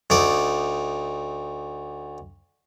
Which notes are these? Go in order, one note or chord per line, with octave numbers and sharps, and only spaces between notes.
D2 D#4 D5